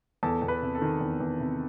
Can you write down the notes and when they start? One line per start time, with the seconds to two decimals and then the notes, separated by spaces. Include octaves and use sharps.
0.23 E2 A4 A5
0.42 E2
0.48 B4
0.62 C3
0.75 A4
0.82 D#3
1.01 E2
1.20 E2
1.40 C3